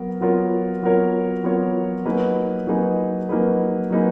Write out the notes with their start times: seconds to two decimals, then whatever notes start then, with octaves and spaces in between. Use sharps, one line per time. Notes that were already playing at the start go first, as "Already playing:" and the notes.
Already playing: F#3 B3 A#4
0.21 F#3 B3 F4 A#4 C#5
0.82 F#3 B3 F4 A#4 C#5
1.44 F#3 B3 F4 A#4 C#5
2.05 F#3 A#3 D#4 G#4 B4
2.67 F#3 A#3 D#4 G#4 B4
3.29 F#3 A#3 D#4 G#4 B4
3.90 F#3 A#3 D#4 G#4 B4